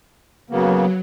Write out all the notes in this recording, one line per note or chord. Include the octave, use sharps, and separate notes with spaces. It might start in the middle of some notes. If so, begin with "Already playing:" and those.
C#3 F#3 A#3 B3